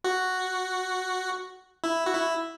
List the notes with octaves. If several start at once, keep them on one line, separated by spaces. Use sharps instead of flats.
F#4
E4
F#4
E4